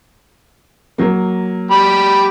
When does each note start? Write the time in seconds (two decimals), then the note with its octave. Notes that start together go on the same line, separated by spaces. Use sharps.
0.98 F#3 A#3
1.71 G4 B5